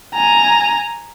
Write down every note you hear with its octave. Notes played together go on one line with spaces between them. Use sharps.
G#5 A#5